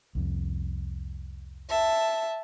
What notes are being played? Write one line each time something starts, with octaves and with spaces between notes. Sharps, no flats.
C2 F2
E5 A5